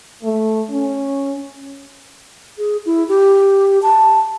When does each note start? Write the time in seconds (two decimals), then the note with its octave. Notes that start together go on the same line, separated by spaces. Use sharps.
0.23 A3
0.70 C#4
2.58 G#4
2.86 E4
3.09 G4
3.83 A5